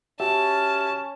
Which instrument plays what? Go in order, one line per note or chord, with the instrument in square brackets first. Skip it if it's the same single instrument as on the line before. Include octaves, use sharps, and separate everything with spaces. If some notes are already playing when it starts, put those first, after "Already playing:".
[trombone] C#4 [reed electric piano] F#4 G4 E5 [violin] A5